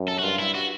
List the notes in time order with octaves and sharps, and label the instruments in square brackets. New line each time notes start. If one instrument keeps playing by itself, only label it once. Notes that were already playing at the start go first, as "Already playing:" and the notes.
Already playing: [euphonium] F#2
[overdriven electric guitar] A4
F#4
[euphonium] G2 [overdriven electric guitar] F4
[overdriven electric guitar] E4
F#4